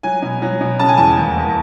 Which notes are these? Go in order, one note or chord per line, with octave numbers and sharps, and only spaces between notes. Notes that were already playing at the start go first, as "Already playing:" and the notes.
F#3 G#5
B2
F#3
B2
C#3 A5
G#5
E2 A5
D#2
D#2